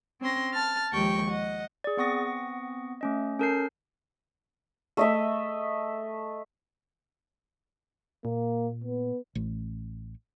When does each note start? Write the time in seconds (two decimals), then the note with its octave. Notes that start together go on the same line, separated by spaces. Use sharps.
0.21 C4 C#4 C6 A#6
0.53 A5 F6 A6
0.92 D#2 F3 G#3 G4 G5 C#6
1.30 D#5 F#5
1.84 G#4 D5
1.97 B3 C4 F#5 C#6 D#6 A#6
3.01 A3 C#4 D#5
3.39 C#4 A4 A#4 A5 G6 C7
4.97 A3 D#5 E5
8.25 A#2 A#3
8.84 B3
9.35 A1